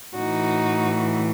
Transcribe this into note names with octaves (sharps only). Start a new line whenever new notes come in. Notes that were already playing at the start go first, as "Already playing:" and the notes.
A2 E3 D#4 F#4